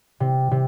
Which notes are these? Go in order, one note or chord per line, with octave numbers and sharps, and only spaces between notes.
C3
C3